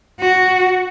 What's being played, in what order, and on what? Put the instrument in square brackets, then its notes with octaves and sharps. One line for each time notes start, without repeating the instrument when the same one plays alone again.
[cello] F#4